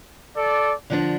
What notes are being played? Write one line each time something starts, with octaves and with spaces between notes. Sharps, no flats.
A4 D5
D3 F3 D4